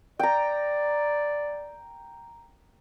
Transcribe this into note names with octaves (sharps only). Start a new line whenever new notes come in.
D5 G5 A#5